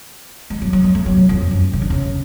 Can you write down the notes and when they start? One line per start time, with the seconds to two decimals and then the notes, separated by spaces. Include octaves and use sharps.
0.50 G#3
0.62 F#3
0.73 F#3
0.84 G#3
0.95 A3
1.06 F#3
1.17 A2
1.29 F2
1.51 F#2
1.73 C#3
1.82 D3
1.90 C#3